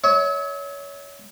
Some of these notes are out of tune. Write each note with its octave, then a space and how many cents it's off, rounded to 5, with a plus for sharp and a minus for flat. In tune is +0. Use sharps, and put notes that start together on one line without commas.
C#5 +20 E5 -40